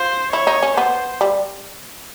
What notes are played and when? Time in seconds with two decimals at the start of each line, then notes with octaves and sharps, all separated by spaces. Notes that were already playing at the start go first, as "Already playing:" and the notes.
Already playing: F4 C5
0.32 E4 C#5
0.47 D#4
0.62 C#4
0.77 B3 C5
1.21 G3